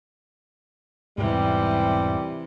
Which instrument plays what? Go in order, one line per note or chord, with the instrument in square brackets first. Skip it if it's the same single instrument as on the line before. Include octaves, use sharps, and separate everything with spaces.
[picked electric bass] E1 G#2 [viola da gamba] C3 E3 [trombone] G3